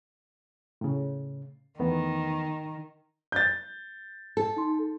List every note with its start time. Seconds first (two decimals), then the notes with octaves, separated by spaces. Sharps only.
0.81 A2 C#3
1.79 E2 D#3 A3 B3
3.32 G6 A6
4.37 A4
4.56 D#4 C6